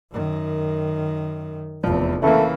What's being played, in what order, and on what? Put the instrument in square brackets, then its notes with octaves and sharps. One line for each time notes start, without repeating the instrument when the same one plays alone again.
[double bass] F#2 D#3
[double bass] F1 E2 [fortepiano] F3
[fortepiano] C#3 A#3 [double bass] E3 [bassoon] A3